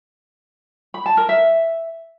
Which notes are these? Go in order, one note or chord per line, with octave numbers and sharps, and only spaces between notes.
B5
A5
A#4
E5